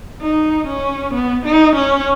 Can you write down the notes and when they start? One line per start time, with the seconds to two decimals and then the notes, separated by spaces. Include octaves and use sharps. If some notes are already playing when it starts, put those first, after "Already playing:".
0.22 D#4
0.67 C#4
1.14 B3
1.45 D#4
1.75 C#4